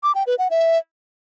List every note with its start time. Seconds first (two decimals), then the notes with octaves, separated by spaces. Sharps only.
0.03 D6
0.15 G5
0.27 B4
0.39 F#5
0.50 E5